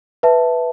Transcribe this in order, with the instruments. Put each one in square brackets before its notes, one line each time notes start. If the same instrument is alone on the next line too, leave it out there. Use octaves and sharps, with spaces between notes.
[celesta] B4 E5 A5